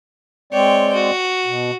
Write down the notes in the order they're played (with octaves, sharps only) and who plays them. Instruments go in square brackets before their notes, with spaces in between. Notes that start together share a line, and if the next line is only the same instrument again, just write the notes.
[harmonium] G#3 C4 D5 [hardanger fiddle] C#5 G5
[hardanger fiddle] F#4
[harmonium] B2